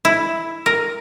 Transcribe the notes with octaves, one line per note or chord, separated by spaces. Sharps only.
E4
A#4